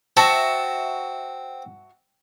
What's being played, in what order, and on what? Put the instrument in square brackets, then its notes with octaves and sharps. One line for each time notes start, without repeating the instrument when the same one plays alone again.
[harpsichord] C4 [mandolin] F#4 E5 A5